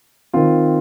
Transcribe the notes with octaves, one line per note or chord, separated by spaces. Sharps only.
D#3 C4 F4